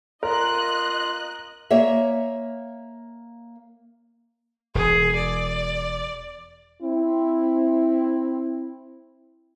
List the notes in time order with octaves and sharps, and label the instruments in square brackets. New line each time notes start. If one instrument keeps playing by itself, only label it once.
[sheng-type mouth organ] F4 [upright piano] A#4 [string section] D#5 F#6
[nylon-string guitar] A#3 C#5 E5
[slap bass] E1 [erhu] G#4
[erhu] D5
[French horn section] C4 E4